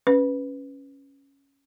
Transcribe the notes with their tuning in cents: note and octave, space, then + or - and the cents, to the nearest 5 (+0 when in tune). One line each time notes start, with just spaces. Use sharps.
C#4 +0 B4 +0